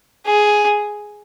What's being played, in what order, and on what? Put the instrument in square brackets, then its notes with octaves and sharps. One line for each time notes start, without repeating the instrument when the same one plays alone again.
[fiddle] G#4